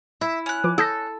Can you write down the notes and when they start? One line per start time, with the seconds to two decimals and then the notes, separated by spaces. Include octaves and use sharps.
0.21 E4 E5
0.46 C#4 F#6
0.64 F3 B4 D6
0.78 A4 D#6 G6 A#6